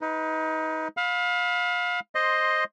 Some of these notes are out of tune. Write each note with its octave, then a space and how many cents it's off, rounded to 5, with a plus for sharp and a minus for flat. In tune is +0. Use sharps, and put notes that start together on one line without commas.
D#4 +25 B4 +0
F5 +30 B5 +0 E6 -30
C5 +10 D#5 +0 C6 +0